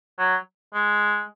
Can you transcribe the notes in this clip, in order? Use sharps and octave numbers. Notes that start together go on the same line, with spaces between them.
F#3
G#3